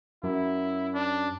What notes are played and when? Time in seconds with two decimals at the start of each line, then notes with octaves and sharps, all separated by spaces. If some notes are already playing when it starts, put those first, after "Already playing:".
0.24 F#2 E4
0.94 D4